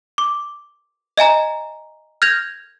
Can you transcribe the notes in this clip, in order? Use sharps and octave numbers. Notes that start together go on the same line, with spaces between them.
D6
D#5 E5 G#5 A#5
F6 G6 G#6 A#6 F7